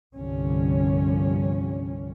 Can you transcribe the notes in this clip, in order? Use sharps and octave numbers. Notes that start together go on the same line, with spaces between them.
G1 C2 D3 F3 G3 C#4